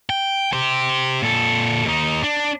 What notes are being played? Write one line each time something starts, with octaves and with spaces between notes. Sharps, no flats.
G5
G4 C5
A#2 A4
D#2 D#4
D4